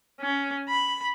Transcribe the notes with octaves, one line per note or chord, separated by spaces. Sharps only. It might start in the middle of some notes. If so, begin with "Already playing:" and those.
C#4
B5